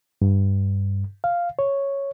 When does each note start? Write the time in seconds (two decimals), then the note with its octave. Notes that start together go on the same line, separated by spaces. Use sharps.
0.22 G2
1.24 F5
1.59 C#5